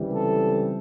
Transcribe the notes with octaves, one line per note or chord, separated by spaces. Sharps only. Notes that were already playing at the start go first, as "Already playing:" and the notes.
Already playing: C#2 C3 E3 G3
A4